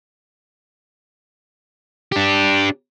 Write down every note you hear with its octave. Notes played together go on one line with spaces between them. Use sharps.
D4 G4